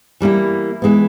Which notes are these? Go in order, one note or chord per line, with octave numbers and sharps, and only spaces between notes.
E3 G3 A#3 E4
E3 G#3 B3